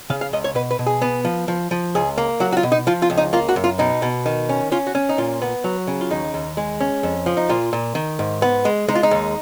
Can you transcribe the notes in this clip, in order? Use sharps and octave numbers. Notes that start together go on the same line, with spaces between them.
C#3 F5
F5
C#2 D#5
C#5
B2 B4
B4
B2
G#4
B3
F3
F3
F3
C#2 G#4
A#3
F#3 F#4
F#4
F4
B2
D#4
F3 F4
F4
C#2
D#4
A#3 F4
F#4
F#2
F4
B2 D#4
B2
D#3
C#4
C#4 F4
F#4
C#4
D#4
A#2 F4
B3
F#3
C#3
F4
D#2 D#4
D#2
G#3
C#4
F2
F3
D#4
A#2 F4
A#2
D#3
G#2
B3
G#3
G#3 D#4
F4
D#4
D#2